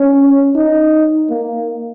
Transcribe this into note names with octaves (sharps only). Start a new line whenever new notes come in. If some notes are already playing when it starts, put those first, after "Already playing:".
Already playing: C#4
D#4
A#3